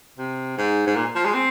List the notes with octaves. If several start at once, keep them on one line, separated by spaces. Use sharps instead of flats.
C3
G#2
G#2
A#2
F3
G#3
C4